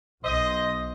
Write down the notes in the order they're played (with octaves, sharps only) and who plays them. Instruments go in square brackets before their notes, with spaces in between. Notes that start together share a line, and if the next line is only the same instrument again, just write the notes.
[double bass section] B1 [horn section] C5 D#5